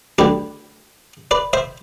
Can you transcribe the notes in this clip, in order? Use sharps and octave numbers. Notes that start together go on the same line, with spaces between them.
D2 D3 G3 G4 B4
B4 D5
C5 E5